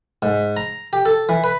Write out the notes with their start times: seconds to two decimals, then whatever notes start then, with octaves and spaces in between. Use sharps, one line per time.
0.22 G#2
0.57 A#5
0.93 G4
1.05 A4
1.29 E3
1.44 B4